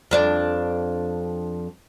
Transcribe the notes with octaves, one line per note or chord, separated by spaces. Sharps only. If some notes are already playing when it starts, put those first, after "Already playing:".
F2 D4 D5